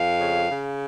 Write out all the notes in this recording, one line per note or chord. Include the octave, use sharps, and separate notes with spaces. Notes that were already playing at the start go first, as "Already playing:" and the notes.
Already playing: F2 F5
C#3
C#3